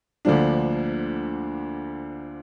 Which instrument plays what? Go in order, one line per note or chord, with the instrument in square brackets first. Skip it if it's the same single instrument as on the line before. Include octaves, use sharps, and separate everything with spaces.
[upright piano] D2 D3 F3 A#3 D4